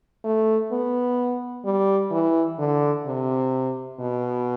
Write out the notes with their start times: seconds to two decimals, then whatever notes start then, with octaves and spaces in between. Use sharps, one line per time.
0.24 A3
0.72 B3
1.65 G3
2.11 E3
2.59 D3
3.06 C3
4.00 B2